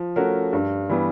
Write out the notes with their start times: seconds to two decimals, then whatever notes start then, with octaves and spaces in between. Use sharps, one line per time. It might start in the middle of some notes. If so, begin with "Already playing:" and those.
Already playing: F3
0.16 A3 C#4 F#4 A#4
0.53 G2
0.89 E3 G3 B3